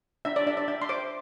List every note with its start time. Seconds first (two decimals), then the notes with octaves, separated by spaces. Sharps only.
0.25 D4 E5
0.36 D5
0.46 D4 E5
0.57 D5
0.68 D4 E5
0.82 C6
0.89 C5 D6